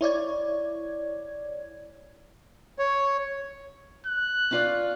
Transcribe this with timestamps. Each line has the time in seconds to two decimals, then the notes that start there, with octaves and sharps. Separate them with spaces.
0.01 E4 C#5 D5 G#6
2.79 C#5
4.06 F#6
4.51 C#4 F4 D5